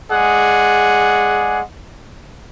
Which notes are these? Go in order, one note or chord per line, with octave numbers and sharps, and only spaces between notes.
G#3 G#4 D5 F#5